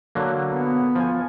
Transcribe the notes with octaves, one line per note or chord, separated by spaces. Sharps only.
D3 F#3 A#3
B3
F3 G#5